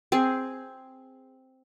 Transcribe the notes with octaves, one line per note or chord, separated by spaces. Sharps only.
C4 G#4